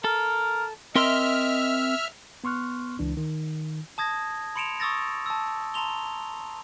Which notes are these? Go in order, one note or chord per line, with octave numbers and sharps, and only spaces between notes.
A4 A#4
C4 A#4 D#5 E5 C6 F6
B3 C6 C#6 F6 F#6
C#2 E3 D4
D#3
A5 D#6 G#6 A#6
B5 C6 C#7 D7 E7 F7
C#6 D#6 E6 A6 A#6
A5 E6
A5 A#5 C6 F7 G7